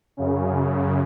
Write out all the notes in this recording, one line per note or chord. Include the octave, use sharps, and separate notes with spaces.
F#2 C#3